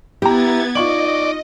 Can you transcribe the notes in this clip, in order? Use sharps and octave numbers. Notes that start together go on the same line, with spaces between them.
B3 E4 G4 A#5 G#6 A6
D#4 F4 D5 D#5 C#6 F#7